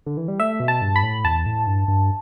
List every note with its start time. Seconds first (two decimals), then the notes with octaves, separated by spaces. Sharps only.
0.06 D3
0.17 E3
0.28 G3
0.40 A3 E5
0.60 B2
0.68 A5
0.82 G2
0.96 B5
1.03 A2
1.25 E2 A5
1.46 A2
1.67 G2
1.88 G2